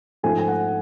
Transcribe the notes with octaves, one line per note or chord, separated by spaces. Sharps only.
G#2 F3 A3 G#5
G#5
F#5